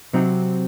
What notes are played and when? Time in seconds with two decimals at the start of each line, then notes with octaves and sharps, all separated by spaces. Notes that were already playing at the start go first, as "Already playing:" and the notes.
0.13 C3 F#3 C4 D#4